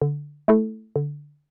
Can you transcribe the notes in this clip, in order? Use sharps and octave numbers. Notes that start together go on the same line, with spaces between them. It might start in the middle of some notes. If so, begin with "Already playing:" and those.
D3
A3 E4 A4
D3